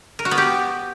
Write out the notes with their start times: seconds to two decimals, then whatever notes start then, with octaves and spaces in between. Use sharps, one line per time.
0.19 A#4
0.25 F#4
0.31 B3
0.38 G4